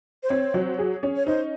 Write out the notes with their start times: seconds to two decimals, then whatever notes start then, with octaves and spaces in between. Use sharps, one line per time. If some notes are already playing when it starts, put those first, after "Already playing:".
0.23 C5
0.29 C4 C#5
0.54 F#3
0.79 G#4
1.03 C#4
1.16 C#5
1.26 D#4 C5